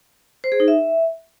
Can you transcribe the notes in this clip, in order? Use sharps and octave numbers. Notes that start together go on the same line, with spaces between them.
C5
G#4
D#4
E5